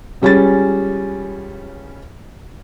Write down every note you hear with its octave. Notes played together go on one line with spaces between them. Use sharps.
C#2 G3 C#4 G#4 A6